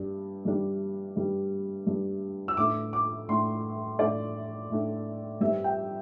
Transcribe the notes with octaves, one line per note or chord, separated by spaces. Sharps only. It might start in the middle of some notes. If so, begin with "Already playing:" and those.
Already playing: G2 G3 D4
G2 G3 D4
G2 G3 D4
G2 G3 D4
E6
A2 A3 D4 D6
D6
A2 A3 D4 C6
A2 A3 D4 D5
A2 A3 D4
G2 G3 C4 E5
G5